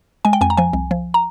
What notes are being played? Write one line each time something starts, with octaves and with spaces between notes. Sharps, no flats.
G#3 G#5
G5
F2 G#5
A#5
F3 G#5
C2
F3
A#5